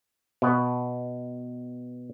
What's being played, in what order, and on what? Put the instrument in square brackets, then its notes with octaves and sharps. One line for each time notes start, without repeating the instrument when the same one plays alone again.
[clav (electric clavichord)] B2 B3